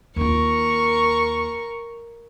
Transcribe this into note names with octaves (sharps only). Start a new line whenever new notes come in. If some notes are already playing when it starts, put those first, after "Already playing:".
D#2 F4 A#4 C#6